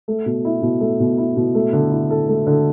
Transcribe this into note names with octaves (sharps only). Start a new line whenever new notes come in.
A3
B2
E4
B2
A3
B2
E4
B2
A3
D3
E4
A4
A3
D3